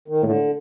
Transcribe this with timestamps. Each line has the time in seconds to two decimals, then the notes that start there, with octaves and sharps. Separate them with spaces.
0.08 D#3
0.23 A2 D3